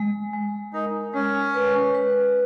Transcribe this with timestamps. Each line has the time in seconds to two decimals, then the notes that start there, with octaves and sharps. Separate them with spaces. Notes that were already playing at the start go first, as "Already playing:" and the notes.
Already playing: G#3
0.33 G#3
0.73 D#4 A#4
1.14 G#3 C#4
1.54 B4
1.95 B4